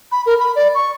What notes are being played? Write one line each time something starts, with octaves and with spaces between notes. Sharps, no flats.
B5
A#4
B5
D5
C#6